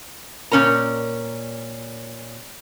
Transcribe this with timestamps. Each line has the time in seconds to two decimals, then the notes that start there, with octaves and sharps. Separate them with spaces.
0.51 A#2 C#4 A#4 A#5